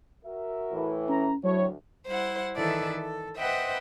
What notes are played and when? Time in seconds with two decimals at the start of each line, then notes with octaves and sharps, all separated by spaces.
0.25 F#4 A#4 E5
0.73 A2 E3
1.09 C#4 A#5
1.44 D2 A2 F#3 C#5
2.07 G3 E4 C5 F#5
2.55 D#3 E3 E4 A4 B4 D5
2.97 A4
3.36 B4 C5 D#5 E5 F#5 G5